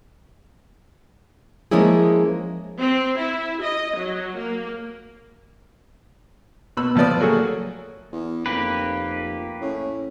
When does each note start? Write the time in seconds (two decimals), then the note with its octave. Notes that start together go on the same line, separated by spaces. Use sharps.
1.71 F3 G#3 A#3 C#4 E4 G#4
2.79 C4
3.17 E4
3.61 D#5
3.97 F#3
4.37 A#3
6.77 B2 B3 B5 E6
6.95 A2 F3 B4 D5 D#6
7.20 F#3 A3 A#3 F#4 G#4 A4
8.12 E2
8.46 F1 F2 A#3 G4 B4
9.61 A2 C#4